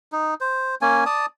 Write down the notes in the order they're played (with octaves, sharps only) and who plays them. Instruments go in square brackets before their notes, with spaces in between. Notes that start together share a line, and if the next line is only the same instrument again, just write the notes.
[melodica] D#4
C5
A#3 C#4 G#5
D5 A5 D#6